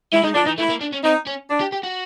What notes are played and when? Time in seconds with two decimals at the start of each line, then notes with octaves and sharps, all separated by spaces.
0.13 G#3 E4
0.23 G#3 D#4
0.34 F3 D4
0.46 E3 D#4
0.58 A3 E4
0.70 A#3
0.81 D4
0.93 C#4
1.04 C4 D#4
1.27 C#4
1.50 D4
1.61 G4
1.72 G4
1.84 F#4